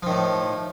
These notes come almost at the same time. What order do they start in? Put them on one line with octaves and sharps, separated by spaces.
F3 D#3 A2